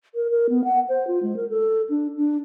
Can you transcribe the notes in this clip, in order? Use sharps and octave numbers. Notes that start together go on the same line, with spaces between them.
A#4
A#4
B3
F#5
C5
F4
G#3
A#4
A4
D4
D4